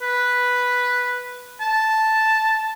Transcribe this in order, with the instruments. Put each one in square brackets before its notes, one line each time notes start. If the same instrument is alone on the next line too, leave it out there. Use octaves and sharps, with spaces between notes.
[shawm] B4
A5